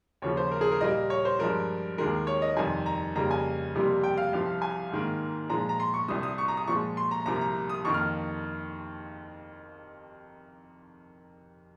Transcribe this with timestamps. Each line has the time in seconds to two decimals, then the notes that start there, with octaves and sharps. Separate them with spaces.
0.22 D#2 C#3 F3 C#5
0.37 C5
0.51 A#4
0.61 G#4
0.71 A#4
0.81 A#2 G3 A#3 D#5
1.10 C#5
1.25 C5
1.39 G2 F3 G#3 A#4
1.98 D#2 D#3 G#3 A#4
2.27 C#5
2.42 D#5
2.57 F2 C3 D#3 G3 G#5
2.86 A#5
3.15 F2 C#3 G3 A#3 A#5
3.31 G#5
3.74 F2 C3 G3 A#3
4.04 G5
4.18 F5
4.33 C2 C3 F3
4.62 G#5
4.91 G#2 D#3 A#3
5.50 A#2 F3 G#3 A#5
5.69 A#5
5.80 C6
5.94 C#6
6.08 C2 C3 G3 D#6
6.23 D#6
6.38 C#6
6.48 A#5
6.57 D#6
6.67 A#2 F3 G#3 C#6
6.97 C6
7.11 A#5
7.26 C2 C3 F3 A#3 A#5
7.41 A#5
7.69 D#6
7.85 F2 D#3 A#3 C#6
7.94 F6